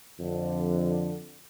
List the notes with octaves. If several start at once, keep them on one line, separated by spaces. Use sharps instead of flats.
F2 D3